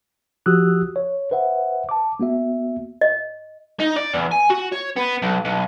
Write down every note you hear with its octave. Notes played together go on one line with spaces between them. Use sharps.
F3 F#4 G4 D#6 E6 F#6
C#5
B4 C5 E5 F#5
A5 D6
A#3 B3 F#4 E5
D#5
D#4
D5
E2
G#5
F#4
C#5
B3
B1
B1